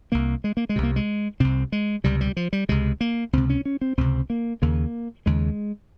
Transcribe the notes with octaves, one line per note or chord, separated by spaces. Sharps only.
C2 C3 A#3
G#3
A#3
G#3
C2 C3
A#3
G#3
C2 C3 C4
G#3
C#2 C3 G3
G3
F3
G3
C#2 C3 G#3
A#3
C#2 C3 C4
C#4
C#4
C4
C#2 C3 C4
A#3
D#2 C#3 A#3
D#2 C#3 G#3